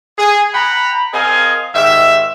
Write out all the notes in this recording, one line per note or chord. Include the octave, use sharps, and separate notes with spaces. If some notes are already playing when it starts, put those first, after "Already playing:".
G#4
F#5 G5 A#5 B5
C4 G#4 A#4 D#5 F5 G#5
G#2 D#3 G4 E5